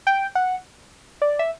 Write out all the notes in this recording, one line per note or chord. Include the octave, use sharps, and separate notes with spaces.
G5
F#5
D5
E5